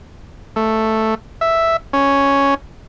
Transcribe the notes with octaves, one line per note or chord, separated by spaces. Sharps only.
A3
E5
C#4